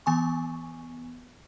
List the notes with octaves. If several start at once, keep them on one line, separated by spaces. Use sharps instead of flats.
E3 B3 G#5 C#6